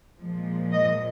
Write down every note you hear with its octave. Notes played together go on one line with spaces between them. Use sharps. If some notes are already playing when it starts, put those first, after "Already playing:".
A#2 F3 G#3
D#5